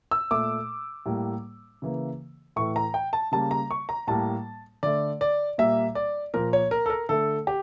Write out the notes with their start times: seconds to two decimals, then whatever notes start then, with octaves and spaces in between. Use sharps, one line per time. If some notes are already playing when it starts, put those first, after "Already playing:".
0.11 E6
0.31 A#2 A3 D6
1.06 A2 G3 A#3
1.82 C#3 E3 A#3
2.56 A2 E3 A3 C#6
2.76 A#5
2.94 G5
3.13 A5
3.32 C#3 G3 A#3 A5
3.51 A#5
3.71 C#6
3.89 A#5
4.08 A2 G3 A#3 A5
4.83 D3 A3 D5
5.21 D5
5.58 A#2 G3 A#3 E5
5.95 D5
6.34 A#2 F3 A#3 A#4
6.53 C#5
6.71 A#4
6.86 A4
6.90 A#4
7.09 D3 A3 A4
7.47 G4